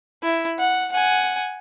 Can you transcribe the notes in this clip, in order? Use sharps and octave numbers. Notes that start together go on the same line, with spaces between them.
E4
F#5
F#5 G#5